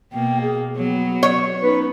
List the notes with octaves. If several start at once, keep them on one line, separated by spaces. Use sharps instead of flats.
B2 A#3 G5
G#4
F#3 B3
C#5
B3 C#4 D#4 B4